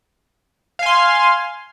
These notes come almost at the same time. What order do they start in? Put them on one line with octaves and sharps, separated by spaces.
F5 G#5 C6